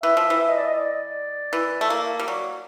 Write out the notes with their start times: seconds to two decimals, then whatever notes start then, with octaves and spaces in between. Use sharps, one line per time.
0.03 E3 E5
0.17 F3
0.30 E3
0.40 E5
0.49 D#5
0.57 D5
0.65 D#5
0.79 D5
1.53 E3
1.81 A3
1.90 A#3
2.19 G3
2.28 F#3 D5